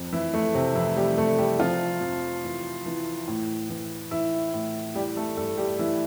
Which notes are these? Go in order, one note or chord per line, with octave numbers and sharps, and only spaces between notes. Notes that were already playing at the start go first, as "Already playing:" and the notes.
Already playing: F2
E3 E4
F2 A3
C3 C4
F2 E3 E4
G3 G4
C3 A3 A4
G3 G4
C3 F3 F4
F2
E3
E3
A2
E3
E3 E4
A2
E3 G3 G4
A3 A4
G2 A3 A4
G3 G4
E3 E4